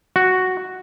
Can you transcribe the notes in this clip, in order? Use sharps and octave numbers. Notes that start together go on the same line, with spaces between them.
F#4